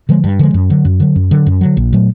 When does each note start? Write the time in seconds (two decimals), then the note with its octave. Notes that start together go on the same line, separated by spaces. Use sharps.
0.09 D3 F3 G#3
0.24 G2
0.39 D3 F3 G#3
0.54 F#2
0.70 D3 F#3
0.85 F#2
1.00 D3 F#3
1.16 F#2
1.31 D3 F#3
1.46 F#2
1.61 D3 F#3
1.77 A#1
1.93 A#2 F#3 A3